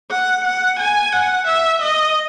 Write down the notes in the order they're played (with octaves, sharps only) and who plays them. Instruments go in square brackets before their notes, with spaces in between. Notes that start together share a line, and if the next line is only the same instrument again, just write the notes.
[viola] F#5
F#5
G#5
F#5
E5
D#5